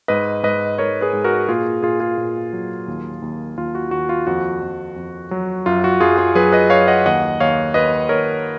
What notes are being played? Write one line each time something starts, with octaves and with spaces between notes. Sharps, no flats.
G#2 B4 D#5
G#2 B4 D#5
G#2 A#4 C#5
G#4 B4
G#2
F#4 A#4
A#2 F4 G#4
A#2 F4 G#4
F4 G#4
A#2
F#3
D#2
D#2
D#2 F4
F#4
D#2 F#4
F4
F2 F#4
F2
F2
F#3
F#2 F4
F#4
F#2 F4 G#4
F4 G#4
F#3 G#4 B4
B4 D#5
F#2 C#5 F5
D#5 F#5
D#2 D#5 F#5
D#2 C#5 F5
D#2 B4 D#5
D#2 A#4 C#5